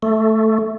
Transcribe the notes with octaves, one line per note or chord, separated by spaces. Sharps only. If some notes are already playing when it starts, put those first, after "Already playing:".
A3